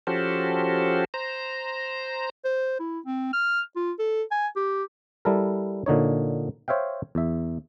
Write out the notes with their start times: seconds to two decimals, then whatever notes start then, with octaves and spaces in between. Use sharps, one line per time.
0.07 F3 C#4 F#4 G4 A4 C5
1.14 C5 A#5
2.45 C5
2.80 E4
3.06 C4
3.33 F6
3.76 F4
3.99 A4
4.31 G#5
4.56 G4
5.25 G3 E4 A4 A#4
5.86 A#2 D3 D#4 C#5
6.68 C5 C#5 E5 F5 G5
7.15 E2 E5